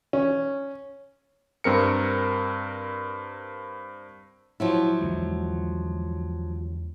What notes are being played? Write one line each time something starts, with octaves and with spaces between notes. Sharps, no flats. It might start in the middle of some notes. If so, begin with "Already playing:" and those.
C#4
G2 C4 A#4 C#7
F3 F#3 E4
E2 D3 G#3